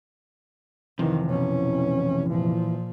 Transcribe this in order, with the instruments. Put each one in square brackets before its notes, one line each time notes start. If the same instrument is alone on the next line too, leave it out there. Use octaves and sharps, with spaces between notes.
[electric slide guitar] F2 C3 [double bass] D#3 [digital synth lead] E3
[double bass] B2 C#4
A#2 F3